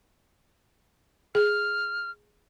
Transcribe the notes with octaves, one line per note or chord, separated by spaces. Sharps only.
G#4 F6